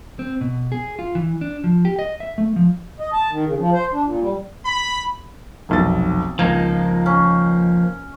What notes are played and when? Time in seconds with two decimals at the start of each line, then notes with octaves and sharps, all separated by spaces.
0.19 C4
0.41 B2
0.72 G#4
0.99 F4
1.15 E3
1.41 D4
1.64 F3
1.85 G4
1.99 D#5
2.20 E5
2.38 A3
2.56 F3
3.00 D#5
3.13 A5
3.31 D#3
3.46 C#3
3.58 F3
3.73 C5
3.93 D4
4.05 A#2
4.21 G3
4.66 B5
5.69 F1 B1 A6
6.39 C#2 F3 A#3 D#4 G#6
7.06 C#4